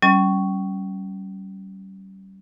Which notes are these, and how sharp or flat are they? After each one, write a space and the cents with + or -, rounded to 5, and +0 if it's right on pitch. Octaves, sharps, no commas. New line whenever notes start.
G3 -30 C#4 +0